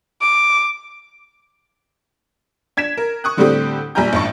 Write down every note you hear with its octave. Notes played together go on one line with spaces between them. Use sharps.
D6
D4 G#6 B6 E7
A#4
C#6 D#6 F#6
A2 D3 G3 A3 C4 G4
A#1 G3 G#5 A#5 G6
A1 G2 C#6